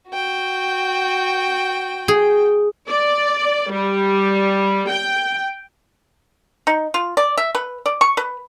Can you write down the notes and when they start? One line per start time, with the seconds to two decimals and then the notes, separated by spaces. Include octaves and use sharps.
0.10 F#4 G5
2.08 G#4
2.89 D5
3.71 G3
4.90 G5
6.67 D#4
6.94 F4
7.17 D5
7.37 E5
7.55 B4
7.86 D5
8.01 C#6
8.17 B4